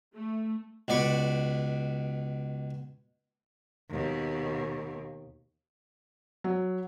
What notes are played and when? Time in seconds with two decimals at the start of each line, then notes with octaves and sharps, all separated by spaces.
0.15 A3
0.88 C#2 B2 D5 B5 C#6
3.90 D#2 B2
6.44 F#3